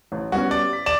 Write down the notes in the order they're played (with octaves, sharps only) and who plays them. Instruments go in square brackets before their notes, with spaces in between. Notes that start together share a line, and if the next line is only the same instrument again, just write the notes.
[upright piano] A1
[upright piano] G3 B3 C#4 [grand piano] F#4
[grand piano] D5
[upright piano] B6
[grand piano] D5 E7